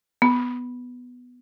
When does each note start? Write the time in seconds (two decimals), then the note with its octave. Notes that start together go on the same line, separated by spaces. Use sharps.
0.22 B3